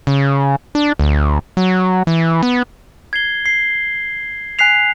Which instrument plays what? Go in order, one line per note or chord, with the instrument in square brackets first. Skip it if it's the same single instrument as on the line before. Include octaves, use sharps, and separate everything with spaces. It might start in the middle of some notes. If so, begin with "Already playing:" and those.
[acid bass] C#3
D4
D2
F#3
E3
B3
[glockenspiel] G#6 C7 G7
C7
G#5 F#6 B6 C7 F7